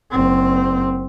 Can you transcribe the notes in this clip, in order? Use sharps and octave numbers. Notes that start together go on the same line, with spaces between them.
F#1 C4